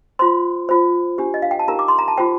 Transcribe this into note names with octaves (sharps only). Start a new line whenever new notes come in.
F4 C5 C6
F4 C5
D4 G4 C5
D#5
F5
G5
A5
D#4 G4 A#4 A#5
D6
C6
A#5
A5
F4 C5 G5